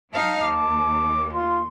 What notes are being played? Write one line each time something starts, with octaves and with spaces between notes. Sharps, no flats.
F#3 D#4 F5 A5
D#2 D6
F4 C6